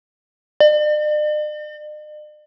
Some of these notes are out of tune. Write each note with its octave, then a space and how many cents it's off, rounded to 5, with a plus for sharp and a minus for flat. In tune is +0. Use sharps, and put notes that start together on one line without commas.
D5 +45